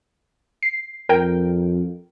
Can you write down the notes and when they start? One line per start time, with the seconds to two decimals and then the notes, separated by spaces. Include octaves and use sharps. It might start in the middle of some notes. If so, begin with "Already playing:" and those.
0.63 C7
1.09 F2 A#4 G5